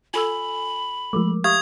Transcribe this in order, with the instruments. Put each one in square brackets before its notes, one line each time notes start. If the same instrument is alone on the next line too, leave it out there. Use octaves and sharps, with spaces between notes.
[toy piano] F4 A4 E6 [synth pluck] G#5 [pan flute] B5
[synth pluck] F3 G#3 A3 [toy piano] A#4 D6
[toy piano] G4 E5 [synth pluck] F5 [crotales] D#6 G#6